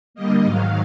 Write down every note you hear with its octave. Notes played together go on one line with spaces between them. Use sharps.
D3 G3 A#3 D#5
G#2 D#3 F#3 F5